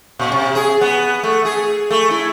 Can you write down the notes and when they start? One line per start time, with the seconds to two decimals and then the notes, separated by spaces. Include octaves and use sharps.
0.19 A#2
0.32 C3
0.55 G#4
0.81 B3
1.23 A3
1.45 G#4
1.90 A3
2.10 E4